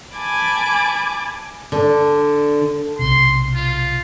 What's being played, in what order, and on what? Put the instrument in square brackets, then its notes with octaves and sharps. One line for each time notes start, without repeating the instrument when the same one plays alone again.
[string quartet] G#5 A5 B5 D6
[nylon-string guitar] D3
[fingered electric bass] B1 C3 [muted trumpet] C6
[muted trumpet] F4